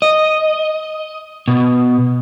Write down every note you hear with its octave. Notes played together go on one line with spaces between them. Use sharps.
D#5
B2